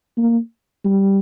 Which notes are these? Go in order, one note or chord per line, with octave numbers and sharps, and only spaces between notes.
A#3
G3